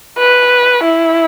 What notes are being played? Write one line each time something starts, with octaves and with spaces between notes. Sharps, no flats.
B4
E4